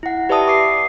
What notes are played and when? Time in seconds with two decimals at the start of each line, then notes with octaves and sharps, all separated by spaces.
0.03 E4 F#5
0.29 G4 B4 D5 E5 A5 D#6
0.48 D6 D#6 C7